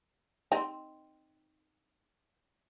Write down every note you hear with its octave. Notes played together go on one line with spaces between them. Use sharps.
C4 D#4